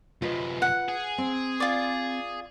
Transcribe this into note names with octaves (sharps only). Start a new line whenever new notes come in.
F#2 C3 F4 B4 D#5
F#5
G#4
C4
F4 D5